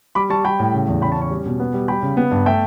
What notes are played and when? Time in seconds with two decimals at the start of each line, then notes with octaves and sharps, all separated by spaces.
0.15 G3 B5 D6
0.30 G3 A5 C#6
0.45 G3 G5 B5
0.59 A2
0.74 C#3
0.88 E2
1.02 C#3 G5 B5
1.11 A5 C#6
1.16 C#4
1.21 A5 C#6
1.31 G3
1.46 B2
1.60 B3
1.74 G3
1.88 G3 G5 B5
2.03 C#3
2.17 B3
2.31 G2
2.46 A3 E5 G5